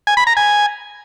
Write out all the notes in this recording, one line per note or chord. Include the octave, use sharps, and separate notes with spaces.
G#5
B5
A#5
G#5